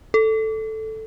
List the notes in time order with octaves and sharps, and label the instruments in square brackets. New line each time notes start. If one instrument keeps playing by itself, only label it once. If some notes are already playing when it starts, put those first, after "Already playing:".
[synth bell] A4